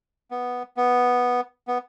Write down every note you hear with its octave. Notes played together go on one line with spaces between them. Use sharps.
B3
B3
B3